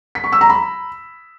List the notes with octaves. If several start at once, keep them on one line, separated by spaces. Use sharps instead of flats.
B6
C#6
E6
A#5
B5